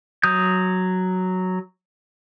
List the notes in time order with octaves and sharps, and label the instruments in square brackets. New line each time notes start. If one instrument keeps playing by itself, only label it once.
[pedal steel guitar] F#3 D#6 G6